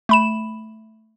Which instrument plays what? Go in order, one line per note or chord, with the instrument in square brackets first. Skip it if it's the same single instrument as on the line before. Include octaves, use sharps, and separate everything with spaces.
[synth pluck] A3 B5 E7